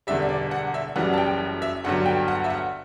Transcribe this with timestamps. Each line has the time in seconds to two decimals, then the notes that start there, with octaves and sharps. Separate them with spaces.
0.07 E1 E2 D3 G3 E5
0.29 D5
0.51 F#5
0.74 E5
0.96 F#1 F#2 E3 G3 F#5
1.13 A5
1.18 G5
1.62 E5
1.84 G1 G2 D3 F#3 F#5
2.06 G5
2.28 F#5
2.44 E5
2.50 F#5